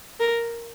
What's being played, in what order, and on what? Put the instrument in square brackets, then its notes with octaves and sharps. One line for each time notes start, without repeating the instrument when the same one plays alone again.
[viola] A#4